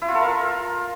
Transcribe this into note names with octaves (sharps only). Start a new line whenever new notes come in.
E4
F4
A4
A#4
F4